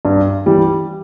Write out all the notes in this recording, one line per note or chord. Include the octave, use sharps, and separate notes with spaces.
G2
E3 G3